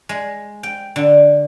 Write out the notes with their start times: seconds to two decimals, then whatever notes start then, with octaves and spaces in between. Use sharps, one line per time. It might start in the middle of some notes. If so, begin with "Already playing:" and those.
0.09 G#3
0.63 G5
0.96 D3